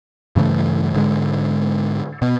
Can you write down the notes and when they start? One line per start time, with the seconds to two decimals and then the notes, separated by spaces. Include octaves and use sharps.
0.36 G2 C#3 E3 A3
0.94 G#2 D3 G#3
2.22 B2